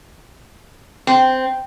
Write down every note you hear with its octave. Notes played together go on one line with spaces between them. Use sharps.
C4